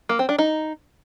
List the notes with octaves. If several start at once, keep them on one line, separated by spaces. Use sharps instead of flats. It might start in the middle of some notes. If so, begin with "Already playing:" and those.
A#3
C4
D4
D#4